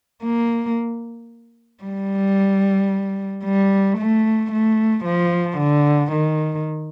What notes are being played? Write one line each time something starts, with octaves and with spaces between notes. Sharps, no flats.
A#3
G3
G3
A3
A3
F3
D3
D#3